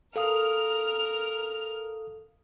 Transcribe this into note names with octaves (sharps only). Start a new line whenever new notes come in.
A4 A#4 F5 D#6 F6